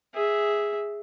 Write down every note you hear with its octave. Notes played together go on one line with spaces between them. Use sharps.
G#4 E5